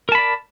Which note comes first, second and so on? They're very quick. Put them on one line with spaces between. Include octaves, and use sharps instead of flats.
A#4 A5 B5 D5